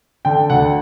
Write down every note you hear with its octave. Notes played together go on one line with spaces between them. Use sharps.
D3 G5
D2 F#5